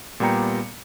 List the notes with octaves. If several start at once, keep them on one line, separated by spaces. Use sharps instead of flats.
A#2 G3 B3 G5 A#5 C#7